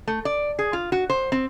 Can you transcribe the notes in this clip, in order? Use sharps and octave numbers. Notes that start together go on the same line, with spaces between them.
A3
D5
G#4
F4
F#4
C5
C4